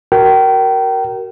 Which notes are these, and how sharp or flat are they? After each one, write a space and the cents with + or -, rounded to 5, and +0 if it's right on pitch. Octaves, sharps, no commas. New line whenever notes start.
F#4 +30 A#4 +0 G5 -30